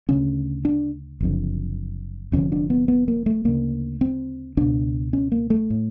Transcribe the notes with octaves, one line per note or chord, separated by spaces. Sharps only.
D2 C#3 C#4
D4
F#1 F2 D3
F1 F2 D3 C#4
D4
B3
B3
A#3
A3
D2 C#3 A#3
C4
C#2 B2 D4
C#4
A#3
A3
A2